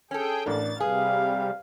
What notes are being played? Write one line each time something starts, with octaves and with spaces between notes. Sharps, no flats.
C#4 G#4 A4 G5
A1 D4 A#4 A6
C3 G3 G#4 B4 F5